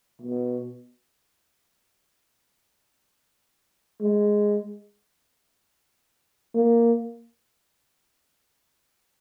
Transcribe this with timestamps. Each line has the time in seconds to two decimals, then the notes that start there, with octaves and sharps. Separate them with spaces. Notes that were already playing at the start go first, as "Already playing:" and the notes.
0.22 B2
4.01 G#3
6.55 A#3